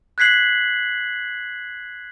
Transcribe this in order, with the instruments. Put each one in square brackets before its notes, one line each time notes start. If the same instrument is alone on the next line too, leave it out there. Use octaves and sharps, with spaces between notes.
[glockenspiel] F#6 G#6 B6 C7 F#7